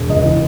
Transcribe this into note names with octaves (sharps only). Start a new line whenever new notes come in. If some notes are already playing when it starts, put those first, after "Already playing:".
Already playing: E1
C#2 D#5
E3